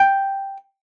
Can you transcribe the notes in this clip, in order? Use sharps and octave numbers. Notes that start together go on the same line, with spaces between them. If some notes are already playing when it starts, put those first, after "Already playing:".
Already playing: G5